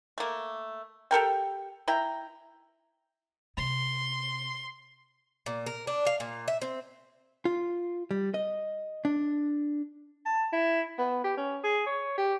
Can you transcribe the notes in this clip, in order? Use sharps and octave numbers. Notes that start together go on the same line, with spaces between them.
A3 A#3
G4 A4 A#4 G5
E4 G5 A#5
C3 C6
A#2
A#4
D4
F5
A#2
E5
C4
F4
G3
D#5
D4
A5
E4
B3
G4
C#4
G#4
C#5
G4